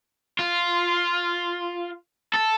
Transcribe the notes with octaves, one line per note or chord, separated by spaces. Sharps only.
F4
A4